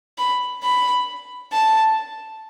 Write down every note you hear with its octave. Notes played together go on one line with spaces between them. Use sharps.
B5
B5
A5